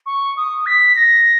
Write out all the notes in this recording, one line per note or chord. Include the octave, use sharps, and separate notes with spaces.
C#6
D#6
B6
A#6